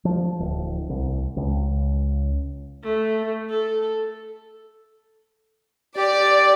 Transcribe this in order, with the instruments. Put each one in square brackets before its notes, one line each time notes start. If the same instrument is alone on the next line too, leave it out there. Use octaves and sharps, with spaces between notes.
[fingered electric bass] F3
D1
C2
C#2
[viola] A3
A4
[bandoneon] G4 [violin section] D5